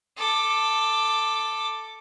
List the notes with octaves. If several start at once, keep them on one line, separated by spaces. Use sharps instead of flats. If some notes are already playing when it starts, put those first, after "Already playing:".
A4 D6